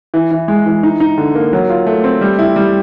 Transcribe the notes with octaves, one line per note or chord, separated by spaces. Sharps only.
E3
E3
G#3
E3
D#4
D#4
D3
A#3
F#3
F4
A3
C4
G3
E4
G3